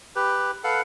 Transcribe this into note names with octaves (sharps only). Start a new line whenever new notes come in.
G4 B4
A4 B4 F5 F#5